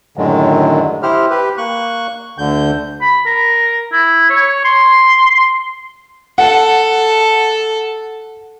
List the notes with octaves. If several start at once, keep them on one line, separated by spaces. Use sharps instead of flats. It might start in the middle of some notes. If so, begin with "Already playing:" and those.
F#2 A2 D3 D#3 F#3 G#3
E4 G4 C5 F6
G4 B4
A#3 C#6 F#6
D2 D3 G6
B5
A#4
E4
C#5
C6
A4 F#5